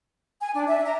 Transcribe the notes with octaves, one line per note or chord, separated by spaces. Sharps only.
G#5
D4
E5
A#5